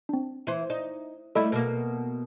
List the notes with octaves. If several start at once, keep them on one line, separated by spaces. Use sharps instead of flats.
C4 D4
E3 C5
D#4 D5
G3 A3 E4 A4 D#5 B5
B2 A#3